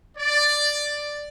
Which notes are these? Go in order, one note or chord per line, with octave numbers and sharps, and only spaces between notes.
D5